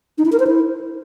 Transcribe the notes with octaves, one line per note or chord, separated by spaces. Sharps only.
D#4
E4
A#4
C5
E4